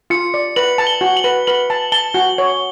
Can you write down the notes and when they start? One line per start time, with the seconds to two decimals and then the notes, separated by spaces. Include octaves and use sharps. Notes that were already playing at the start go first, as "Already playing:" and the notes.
0.10 F4 C#7
0.34 D5
0.56 B4 F#7
0.78 A5
0.87 G7
1.01 F#4
1.17 F#7
1.24 B4
1.47 B4 F#7
1.70 A5
1.92 A5 G7
2.14 F#4
2.38 C#5